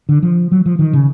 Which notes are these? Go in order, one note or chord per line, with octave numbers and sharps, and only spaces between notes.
D3
F3
F#3
F3
D#3
C#3